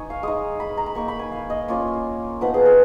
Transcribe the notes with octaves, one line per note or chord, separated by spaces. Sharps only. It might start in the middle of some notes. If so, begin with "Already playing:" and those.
Already playing: D#4 G#5 C#6
F5
G#3 D#4 D#6
B5
A#5
B5
A#3 D#4 C#6
B5
G#5
F5
D#5
A#3 C#4 F4 C#5
F3 B3 D#4 B4
G#4
G#4